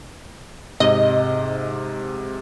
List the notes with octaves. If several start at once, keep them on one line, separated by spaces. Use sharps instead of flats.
G#2 C3 D#5